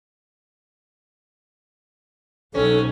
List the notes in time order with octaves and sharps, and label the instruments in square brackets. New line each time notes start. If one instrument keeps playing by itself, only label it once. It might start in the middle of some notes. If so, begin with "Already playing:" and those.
[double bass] B1 D#4 [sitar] C3 C#4 [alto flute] A4